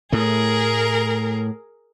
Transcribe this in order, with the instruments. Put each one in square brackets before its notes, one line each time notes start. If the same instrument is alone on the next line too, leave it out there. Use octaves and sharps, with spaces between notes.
[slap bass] A2 A3 [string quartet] G#4 A#4